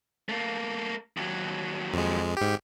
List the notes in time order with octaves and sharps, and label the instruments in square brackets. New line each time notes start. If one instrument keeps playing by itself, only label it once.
[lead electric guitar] A3 A#3
D#2 F#3
[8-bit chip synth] F2 G#3
G#2 G4